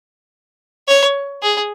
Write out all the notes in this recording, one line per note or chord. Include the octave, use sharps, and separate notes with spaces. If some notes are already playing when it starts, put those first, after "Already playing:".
C#5
G#4